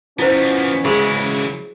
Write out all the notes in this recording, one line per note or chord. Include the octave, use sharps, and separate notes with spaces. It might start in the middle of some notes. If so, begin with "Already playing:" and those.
B2 F3 B3 C#4 E4 C5
C#3 F#3 G#3 E4 G#4 C#6 D#6